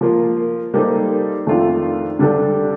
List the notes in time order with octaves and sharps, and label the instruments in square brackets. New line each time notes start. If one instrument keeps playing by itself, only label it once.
[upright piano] F3 A#3 F4
G3 A#3 D#4 A4 C5
F2 D#3 A3 D4 F4
D3 G3 D4 A4